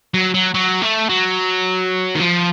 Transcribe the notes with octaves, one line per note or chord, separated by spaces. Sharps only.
F#3
F#3
F#3
A3
F#3
D#3
F3